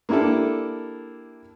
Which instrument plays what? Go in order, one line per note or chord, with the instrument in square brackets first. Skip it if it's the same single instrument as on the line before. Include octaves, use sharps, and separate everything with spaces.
[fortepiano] A#3 D4 E4 G4 A4